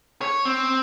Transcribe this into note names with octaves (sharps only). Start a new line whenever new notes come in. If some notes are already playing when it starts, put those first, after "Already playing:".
C#5
C4